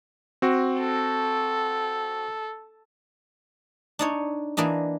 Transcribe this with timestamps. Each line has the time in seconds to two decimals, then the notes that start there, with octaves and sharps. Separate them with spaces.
0.42 C4 F#4
0.80 A4
3.99 D4 D#4 C#5
4.57 E3 A#3 D4 D#5